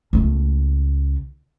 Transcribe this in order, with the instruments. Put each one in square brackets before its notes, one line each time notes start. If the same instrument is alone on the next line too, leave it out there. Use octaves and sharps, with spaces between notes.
[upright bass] C#2 A3